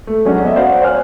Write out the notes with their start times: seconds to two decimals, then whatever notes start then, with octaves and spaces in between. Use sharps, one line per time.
0.07 A3
0.25 F#3 G#3 C#4 D4 F#4
0.43 B3 D#5 E5
0.56 F#4 C5 D5 F5 F#5
0.82 C5 C#5 G#5 F6 F#6